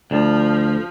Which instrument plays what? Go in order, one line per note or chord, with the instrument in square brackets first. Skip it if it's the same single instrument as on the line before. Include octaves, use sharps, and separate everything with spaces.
[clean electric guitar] D2 [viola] F3